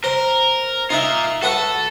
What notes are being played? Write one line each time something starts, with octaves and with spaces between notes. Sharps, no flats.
A#4 C5
D#4 F4 A#4 E5
F#4 A4 B4 F#5